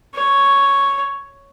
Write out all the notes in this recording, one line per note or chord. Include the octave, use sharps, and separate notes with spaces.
C#5